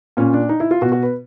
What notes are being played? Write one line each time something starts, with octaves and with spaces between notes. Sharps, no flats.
A#2 C#4
D4
D#4
E4
F4
B2 F#4
F#4
B4